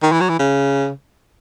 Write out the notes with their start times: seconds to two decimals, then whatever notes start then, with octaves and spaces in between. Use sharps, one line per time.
0.02 D#3
0.12 E3
0.20 F#3
0.29 E3
0.39 C#3